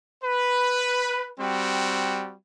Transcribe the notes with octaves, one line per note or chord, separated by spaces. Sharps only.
B4
G3 C4 F#4